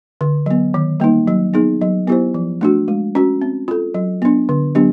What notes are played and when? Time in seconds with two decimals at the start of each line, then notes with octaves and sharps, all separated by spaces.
0.21 D3
0.46 F#3 B3
0.74 D#3
1.00 G3 A#3 D#4
1.28 F#3
1.54 B3 D#4 G#4
1.81 F#3
2.08 B3 E4 G4 C5
2.34 F3
2.61 A3 D4 F#4
2.88 G#3
3.15 C#4 F#4
3.42 C4
3.68 F4 A4
3.94 F#3
4.22 B3 D4
4.49 D3
4.75 F#3 B3 D4 G4